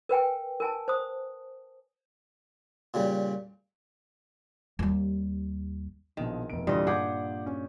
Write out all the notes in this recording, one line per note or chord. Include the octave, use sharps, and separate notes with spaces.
A#4 B4 G5 G#5
A#4 G#5 A5
C5 D#6
A#2 C#3 G3
D#2 G3
A#1 B2 D#3 F3
F1 B2 D7
E2 A#2 D3 G3 D#5 C6 D#6
G2 G#4 F#5 D6 G6
C#4